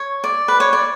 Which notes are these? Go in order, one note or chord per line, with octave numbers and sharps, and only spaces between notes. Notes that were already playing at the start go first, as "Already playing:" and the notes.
Already playing: C#5
D5
B4
C#5
D5